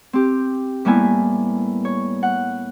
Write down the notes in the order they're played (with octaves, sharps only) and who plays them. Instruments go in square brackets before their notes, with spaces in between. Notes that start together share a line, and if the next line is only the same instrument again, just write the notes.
[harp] C4 G4
A2 G3 A#3 B3 E4 G#5
C#5
F#5